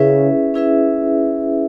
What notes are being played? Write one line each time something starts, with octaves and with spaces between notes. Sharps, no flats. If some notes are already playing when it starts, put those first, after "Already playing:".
Already playing: C#3 C#4 E4 G#4 B4 E5
C#4 E4 G#4 B4 E5